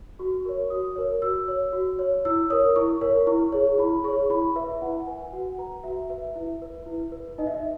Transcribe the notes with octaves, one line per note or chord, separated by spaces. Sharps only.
F#4 C#6
A#4 C#5 C#6
F#4 D#6
A#4 C#5
F#4 E6
C#5
F#4
C#5
E4 E6
A#4 C#5 D#6
E4 C#6
A#4 C#5
E4 C#6
G#4 C#5
E4 B5
G#4 C#5 C#6
E4 B5
B4 E5
E4 F#5
B4 G#5
F#4 F#5
B4 A#5
F#4 E5
B4 E5
E4 E5
B4
E4
B4
D#4 D#5
E5
D#5